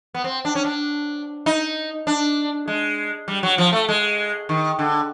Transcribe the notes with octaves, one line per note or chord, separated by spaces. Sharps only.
B3
C4
D4
C#4
D4
D#4
D4
G#3
G3
F#3
F3
A3
G#3
D#3
D3